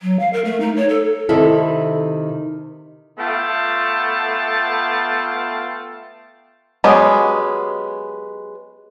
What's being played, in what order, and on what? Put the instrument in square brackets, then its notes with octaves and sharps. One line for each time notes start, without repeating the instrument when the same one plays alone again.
[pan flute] F#3
F5
A#4
A3
D#4
C#5
A4
[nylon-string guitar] C3 D#3 E4 A4
[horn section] A3 B3 F4 G5 A5
[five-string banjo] F#3 G#3 B3 C#4 G4